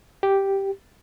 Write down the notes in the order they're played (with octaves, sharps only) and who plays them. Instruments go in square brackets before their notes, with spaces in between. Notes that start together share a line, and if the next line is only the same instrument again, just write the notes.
[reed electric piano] G4